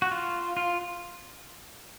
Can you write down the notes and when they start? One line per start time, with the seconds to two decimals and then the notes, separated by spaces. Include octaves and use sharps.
0.02 F#4
0.12 F4
0.57 F4